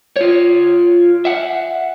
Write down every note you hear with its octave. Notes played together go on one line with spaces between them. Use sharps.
F4 C#5
E5 F#5